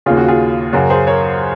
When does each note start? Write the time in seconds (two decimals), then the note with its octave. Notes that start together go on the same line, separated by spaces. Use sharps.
0.06 D#2 C#3 F4 G#4
0.17 F#4
0.28 F4 G#4
0.73 F#2 C#3 F#4 A#4
0.90 G#4 C5
1.07 A#4 C#5